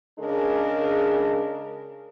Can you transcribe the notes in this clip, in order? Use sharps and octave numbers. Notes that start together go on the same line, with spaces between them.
C#3 G#3 D4 G#4 A#4